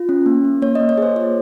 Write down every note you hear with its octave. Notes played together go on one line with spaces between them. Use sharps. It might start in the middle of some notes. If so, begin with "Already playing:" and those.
Already playing: F4
C#4
A#3
A#3
A#3 C#5
D#5
A#3
C#5
G#4 C5
F4 C#5